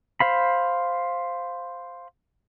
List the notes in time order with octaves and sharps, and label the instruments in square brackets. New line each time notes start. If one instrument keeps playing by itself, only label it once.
[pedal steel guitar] C5 F5 B5